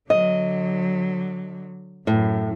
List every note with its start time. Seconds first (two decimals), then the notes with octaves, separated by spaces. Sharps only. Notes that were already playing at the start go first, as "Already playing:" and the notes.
0.10 D3 F#3 D#5
2.07 F#2 A2